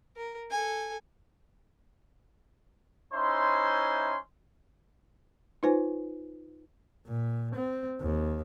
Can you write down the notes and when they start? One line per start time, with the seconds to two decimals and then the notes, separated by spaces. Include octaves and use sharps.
0.16 A#4
0.51 A4 G#5
3.14 C#4 D#4 E4 C5 E5 C6
5.63 D#4 F4 B4 C5 G#5
7.07 A#2
7.56 C4
8.01 D#2